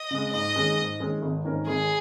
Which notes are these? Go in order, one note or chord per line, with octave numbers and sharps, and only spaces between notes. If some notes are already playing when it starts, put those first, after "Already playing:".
Already playing: D#5
C#3 G#3
G#2 D#5
D#3 G#3 C#4 G#4
G#2
D#3 G#3 C#4 G#4
G#1
G#2 D#3 C#4 A#4
G#1 G#4